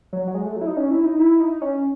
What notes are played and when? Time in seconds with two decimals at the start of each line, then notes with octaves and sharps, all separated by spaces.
0.13 F#3
0.27 F#3
0.35 G#3
0.45 A3
0.56 F#3
0.61 E4
0.67 D#4
0.77 C#4
0.91 E4
1.05 D#4
1.19 E4
1.40 D#4
1.62 C#4